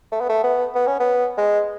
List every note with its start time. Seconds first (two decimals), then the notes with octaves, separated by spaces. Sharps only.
0.12 A3
0.21 B3
0.29 A3
0.44 B3
0.75 B3
0.87 C#4
1.00 B3
1.38 G#3